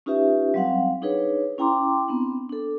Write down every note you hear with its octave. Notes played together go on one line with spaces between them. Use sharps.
C#4 D#4 F4 G4 B4 E5
F#3 G3 C4 F5 F#5
D4 D#4 G#4 B4 C#5
C#4 E4 G5 A#5 C6 D6
B3 C4 D4
D4 A4